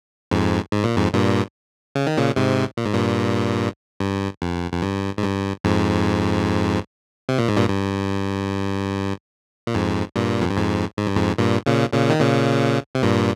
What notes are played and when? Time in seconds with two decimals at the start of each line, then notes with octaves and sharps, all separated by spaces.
0.31 F2 G#2
0.72 G#2
0.84 A#2
0.97 F2 G#2
1.13 G2 A#2
1.95 C#3
2.07 D#3
2.18 A#2 C#3
2.36 G#2 C3
2.77 A#2
2.85 G#2
2.94 G2 A#2
4.00 G2
4.42 F2
4.72 F2
4.82 G2
5.18 G#2
5.24 G2
5.64 F2 G#2
7.29 C3
7.38 A#2
7.48 G#2
7.57 G2 A#2
7.70 G2
9.67 A#2
9.75 F2 G#2
10.16 G2 A#2
10.41 F2
10.49 G2
10.57 F2 G#2
10.98 G#2
11.07 G2
11.16 F2 G#2
11.38 G2 A#2
11.66 A#2 C#3
11.93 A#2 C#3
12.10 D#3
12.21 A#2 C#3
12.95 C3
13.03 G2 A#2